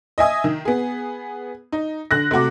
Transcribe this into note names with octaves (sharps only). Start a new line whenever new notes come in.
D#5 E5 G#5 D#6
D#3
B3 G#4
D#4
D3 F#6 A#6
C3 A3 F#4 D6